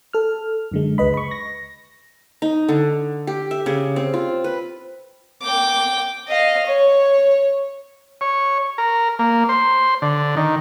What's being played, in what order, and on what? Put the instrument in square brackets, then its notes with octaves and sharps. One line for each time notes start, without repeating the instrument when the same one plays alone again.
[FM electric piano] A4 F6
F#2 D3 G#3
C#2 B4 D#5 B5
B5 C#6
A#6
[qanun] D#4
D3
G4
E5
C#3
C4
F4
B4
[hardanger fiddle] G5 D6
D#5 F5
C#5
[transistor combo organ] C#5
A#4
A#3
C5
D3
D#3